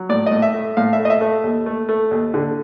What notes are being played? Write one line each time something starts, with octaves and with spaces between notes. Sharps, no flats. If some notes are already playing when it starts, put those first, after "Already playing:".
Already playing: F#3
A2 D5
D#5
A2
E5
A3
A2 F5
E5
A3
D#5
E5
A3
D#2
A3
A3
D#2
D3